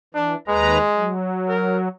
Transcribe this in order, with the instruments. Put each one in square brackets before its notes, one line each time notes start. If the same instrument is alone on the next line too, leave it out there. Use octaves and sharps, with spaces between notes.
[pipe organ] E3 [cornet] D4
[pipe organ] D#2 B4 A#5 [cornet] G#3
[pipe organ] F#3
[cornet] A#4